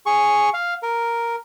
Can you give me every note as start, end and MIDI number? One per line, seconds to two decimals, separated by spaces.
0.06 0.49 68
0.06 0.49 85
0.54 0.74 77
0.83 1.36 70